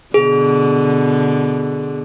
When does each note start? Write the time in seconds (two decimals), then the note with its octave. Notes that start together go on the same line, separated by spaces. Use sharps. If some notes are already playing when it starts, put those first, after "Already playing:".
0.14 B2 D3 G#4